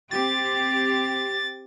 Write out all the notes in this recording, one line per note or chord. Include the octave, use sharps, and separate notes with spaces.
C4 G4 A6